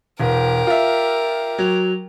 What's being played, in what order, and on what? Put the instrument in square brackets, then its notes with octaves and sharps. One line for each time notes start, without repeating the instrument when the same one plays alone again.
[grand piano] E1 [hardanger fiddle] G4 A#4
[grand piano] F4 E5
F#3